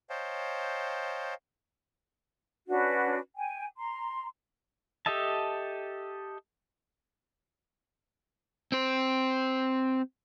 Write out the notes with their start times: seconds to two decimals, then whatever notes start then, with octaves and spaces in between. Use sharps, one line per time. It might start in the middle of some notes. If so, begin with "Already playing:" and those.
0.10 C5 C#5 D#5 F5 G5 A5
2.68 C#4 D4 F#4 B4
3.35 G5 G#5
3.77 A#5 C6
5.06 G4 A4 D#5 E5 A5
8.72 C4 C5